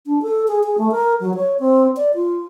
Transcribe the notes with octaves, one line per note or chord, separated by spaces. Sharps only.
D4
A4
G#4
G#4
A3
A#4
F#3
C#5
C4
D5
F4